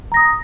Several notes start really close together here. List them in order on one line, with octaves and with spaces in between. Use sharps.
A#5 A#6 D#6